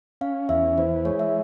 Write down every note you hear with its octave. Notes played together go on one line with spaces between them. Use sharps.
C#4 F5
E2 E5
E3 C5
G#3 C#5
E5